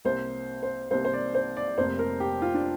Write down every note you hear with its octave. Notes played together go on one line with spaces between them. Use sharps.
C2 C3 A#3 C5
C5
C2 C3 A#3 C5
C5
D5
C5
D5
F1 F2 C3 A#3 C5
A#4
G4
F4
D4